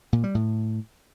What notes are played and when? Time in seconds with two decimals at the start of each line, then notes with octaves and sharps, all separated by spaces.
0.13 A#2
0.24 G3
0.35 A2